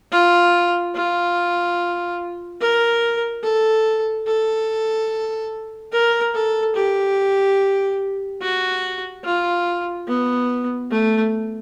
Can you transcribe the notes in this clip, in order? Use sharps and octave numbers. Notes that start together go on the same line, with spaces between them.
F4
F4
A#4
A4
A4
A#4
A4
G4
F#4
F4
B3
A3